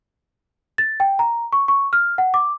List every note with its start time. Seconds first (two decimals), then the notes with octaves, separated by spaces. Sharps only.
0.78 A6
1.00 G5
1.19 A#5
1.53 C#6
1.68 C#6
1.93 F6
2.18 F#5
2.34 D6